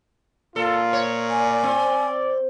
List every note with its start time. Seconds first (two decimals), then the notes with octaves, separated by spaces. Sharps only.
0.56 A#2 F4 A4
0.93 C#5
1.30 D5 G#5
1.63 C4